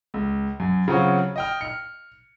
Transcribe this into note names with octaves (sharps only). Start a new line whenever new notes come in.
C#2
F#2
C#3 F#3 C4 F4 F#4 C#5
D#5 G5 F6
F6 C#7